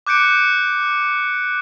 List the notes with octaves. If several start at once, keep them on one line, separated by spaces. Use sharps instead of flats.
D6 F#6 G6 C#7 D7